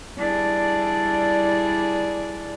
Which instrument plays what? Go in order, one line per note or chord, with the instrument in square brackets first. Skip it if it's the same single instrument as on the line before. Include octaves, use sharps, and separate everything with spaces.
[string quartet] G3 D4 E4 G#4 D5